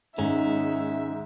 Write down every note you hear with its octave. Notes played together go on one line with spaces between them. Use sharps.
G#2 D#3 C#4 D#4 E5